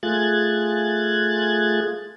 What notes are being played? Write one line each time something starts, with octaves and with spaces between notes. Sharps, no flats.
A3 F4 G#4 F#6 G#6 A6